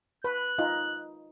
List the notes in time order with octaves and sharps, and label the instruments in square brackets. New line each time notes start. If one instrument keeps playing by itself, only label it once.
[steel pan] B4 [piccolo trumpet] F#6
[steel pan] D#4 F4